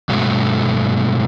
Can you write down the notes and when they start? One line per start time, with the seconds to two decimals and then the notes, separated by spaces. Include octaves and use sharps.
0.09 G2 B2 F#3 G#3 A3